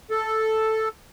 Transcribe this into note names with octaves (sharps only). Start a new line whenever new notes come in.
A4